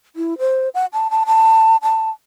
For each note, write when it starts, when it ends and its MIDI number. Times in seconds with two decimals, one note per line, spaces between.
0.16 0.38 64
0.39 0.69 72
0.74 0.86 78
0.93 1.10 81
1.10 1.24 81
1.26 1.76 81
1.82 2.10 81